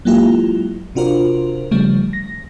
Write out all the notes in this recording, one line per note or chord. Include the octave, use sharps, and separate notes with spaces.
F#3 G#3 A#3 E4 F4 G4
C3 D4 F4 F#4 A#4 C5
C#3 F3 G3 A3
A#6